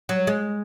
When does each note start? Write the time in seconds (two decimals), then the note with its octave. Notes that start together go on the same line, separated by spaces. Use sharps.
0.09 F#3
0.27 G#3